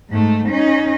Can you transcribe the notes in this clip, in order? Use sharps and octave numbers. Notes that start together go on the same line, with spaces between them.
G#2 A3
C#4 D#4